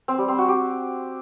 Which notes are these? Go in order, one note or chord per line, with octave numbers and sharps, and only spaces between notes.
C4
G3
C4
F#4
G4